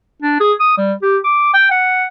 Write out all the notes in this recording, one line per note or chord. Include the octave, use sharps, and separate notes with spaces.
D4
G#4
D#6
G3
G4
D6
G5
F#5